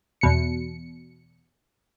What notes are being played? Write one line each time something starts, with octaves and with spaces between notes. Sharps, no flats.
E2 B2 C#7